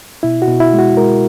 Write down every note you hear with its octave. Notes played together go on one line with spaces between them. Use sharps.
B2 E4
F#4
B2
E4
G#3
F#4
G#3 A#4